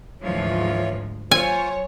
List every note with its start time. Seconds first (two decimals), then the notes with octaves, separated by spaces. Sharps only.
0.22 D2 G#2 E3 F3 F4 C#5
1.31 F#3 F4 C5 C#5 G#5